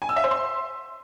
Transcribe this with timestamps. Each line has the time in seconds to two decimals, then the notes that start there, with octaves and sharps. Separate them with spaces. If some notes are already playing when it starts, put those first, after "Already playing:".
0.02 G#5
0.09 E6
0.16 E5
0.24 C5
0.31 C6